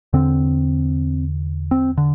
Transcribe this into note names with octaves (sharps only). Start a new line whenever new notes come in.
E2 D3 C4
C4
D3